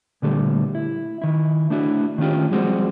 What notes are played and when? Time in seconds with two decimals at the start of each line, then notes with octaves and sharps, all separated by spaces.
0.22 A#2 D3 G3 A3
0.75 E4
1.22 D#3 E4
1.70 A3 D4 E4 F#4
2.18 D#3 A3 C#4 F4 G4
2.51 F3 G3 G#3 C4 F#4